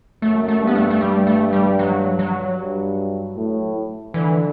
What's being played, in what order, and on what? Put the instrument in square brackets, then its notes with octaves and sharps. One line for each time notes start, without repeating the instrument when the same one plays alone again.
[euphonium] F#2 [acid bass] A3
[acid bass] A3
[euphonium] G2
[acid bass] B3
A3
A3
G3
A3
G3
F#3
F#3
[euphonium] G2
A2
[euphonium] D3 [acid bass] E3